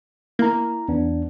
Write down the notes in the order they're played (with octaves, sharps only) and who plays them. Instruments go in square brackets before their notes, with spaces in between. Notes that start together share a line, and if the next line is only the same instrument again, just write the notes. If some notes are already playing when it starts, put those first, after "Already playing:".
[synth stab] A#3 [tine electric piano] E4 A#5
[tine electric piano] E2 B3 D4